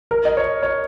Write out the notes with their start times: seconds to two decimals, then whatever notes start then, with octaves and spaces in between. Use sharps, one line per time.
0.11 A#4
0.25 D#5
0.37 C#5
0.62 C#5